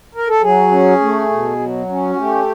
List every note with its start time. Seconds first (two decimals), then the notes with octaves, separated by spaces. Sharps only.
0.15 A#4
0.28 A4
0.42 F#3 G#4
0.71 C#4
1.01 A3
1.30 B2
1.59 F#3
1.89 C#4
2.13 F#4
2.18 A3 G4